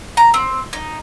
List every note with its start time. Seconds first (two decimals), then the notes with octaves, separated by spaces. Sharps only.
0.17 A#5
0.34 C4
0.73 D#4